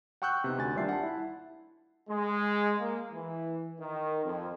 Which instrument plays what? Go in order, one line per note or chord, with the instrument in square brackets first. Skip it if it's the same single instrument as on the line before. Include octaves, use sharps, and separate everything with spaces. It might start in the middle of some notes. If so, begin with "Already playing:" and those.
[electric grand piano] F#5 G5 C#6 E6 F#6 G6
C3 B3 D#4
D2 G#5 A6
D#2 G3 D4 F4 E5 C7
F#5 A5
E4
[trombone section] G#3
A#3
E3
D#3
F2